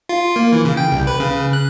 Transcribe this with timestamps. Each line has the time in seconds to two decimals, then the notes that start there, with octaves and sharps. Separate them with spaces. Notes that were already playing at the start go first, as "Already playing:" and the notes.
0.09 F4
0.36 A#3
0.52 E3
0.65 C#3
0.77 G5
0.92 C2
1.07 B4
1.20 C#3
1.53 F#6